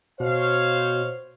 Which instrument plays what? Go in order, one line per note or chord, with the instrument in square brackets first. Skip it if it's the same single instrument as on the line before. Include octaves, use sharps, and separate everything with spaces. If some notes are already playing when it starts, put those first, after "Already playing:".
[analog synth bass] B2 [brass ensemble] C5 C#5 F5